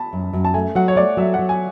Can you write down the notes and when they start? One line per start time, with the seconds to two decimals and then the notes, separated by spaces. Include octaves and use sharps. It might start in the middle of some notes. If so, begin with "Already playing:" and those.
Already playing: A5 B5
0.13 F#2
0.33 F#2
0.45 A5
0.54 A3 G#5
0.75 F#3 F#5
0.88 C#5
0.96 A3 D5
1.17 F#3 E5
1.34 F#5
1.39 F#3
1.49 G#5